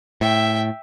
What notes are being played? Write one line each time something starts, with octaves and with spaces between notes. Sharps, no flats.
A2 E5 G5